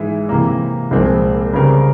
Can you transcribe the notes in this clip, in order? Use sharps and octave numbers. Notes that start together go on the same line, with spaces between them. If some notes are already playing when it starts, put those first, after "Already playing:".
Already playing: G#2 E3 G#3 E4
C3 E3 A#3
C2 A#2 F3 G#3 C4
C#3 G3 C4 G4 A#4